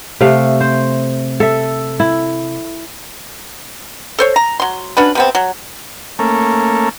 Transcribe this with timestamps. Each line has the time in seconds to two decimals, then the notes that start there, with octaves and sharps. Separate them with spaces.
0.21 C3 A3 E5 F5
0.60 C5
1.40 A4 E5
2.00 E4
4.18 A4 C5 C#5
4.36 A#5
4.60 F#3 C6
4.97 C#4 D4 F#4 B4
5.15 C3 B3 C4
5.35 F#3
6.19 A3 A#3 C#4